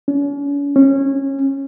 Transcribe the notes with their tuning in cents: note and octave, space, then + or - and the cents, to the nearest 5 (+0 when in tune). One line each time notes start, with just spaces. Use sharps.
C#4 +40
C#4 -20